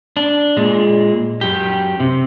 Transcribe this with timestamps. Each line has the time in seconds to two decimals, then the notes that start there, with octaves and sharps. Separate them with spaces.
0.17 D4
0.57 A#2 G#3
1.41 F#2 G4
2.00 C3